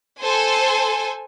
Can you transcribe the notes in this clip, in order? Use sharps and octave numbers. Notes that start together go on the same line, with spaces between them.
A4 C5 G#5